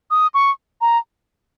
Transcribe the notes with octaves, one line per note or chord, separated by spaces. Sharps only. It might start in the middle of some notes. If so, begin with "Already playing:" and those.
D#6
C#6
A#5